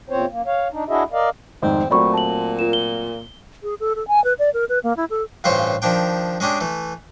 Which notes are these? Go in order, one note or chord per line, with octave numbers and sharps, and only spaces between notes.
E2 A#2 C4 C5 C#5
F#2 A#3
C#5 F5
D4 D#4
D4 E4 F#4 G#4 D#5 E5
A#4 D5 D#5 F5
F1 G#2 D#3 C4
A#2 F#3 A3 C4 D5 B5 C#6
A5 F#7
F4 A#4 E7
G7
G#4
A4
A4
G#5
B4
D5
A#4
B4
A#3
E4
A4
A1 G2 C#3 F4 C5 C#5
D#3 F3 D4 G5
G#3 C#4 D4 G4 G#4
E3 A3